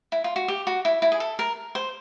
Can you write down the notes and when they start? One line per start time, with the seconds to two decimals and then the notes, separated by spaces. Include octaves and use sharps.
0.12 E4
0.24 F4
0.36 F#4
0.48 G4
0.67 F#4
0.85 E4
1.02 E4
1.12 G#4
1.20 A4
1.39 A#4
1.75 C5